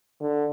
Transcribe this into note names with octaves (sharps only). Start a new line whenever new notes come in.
D3